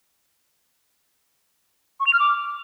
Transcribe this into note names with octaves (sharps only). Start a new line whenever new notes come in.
C#6
F7
F6
D6